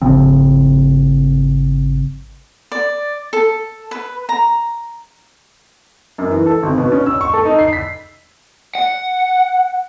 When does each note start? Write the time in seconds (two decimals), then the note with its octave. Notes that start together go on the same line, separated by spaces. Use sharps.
0.02 G#1 C#3 F3 C4
2.72 D5
3.33 A4
3.91 B4
4.29 A#5
6.18 F#2
6.31 E3
6.46 A4
6.63 G#1
6.78 B2
6.92 C#4
7.06 E6
7.21 C#6
7.33 A4
7.45 D#4
7.59 C7
7.73 B6
8.75 F#5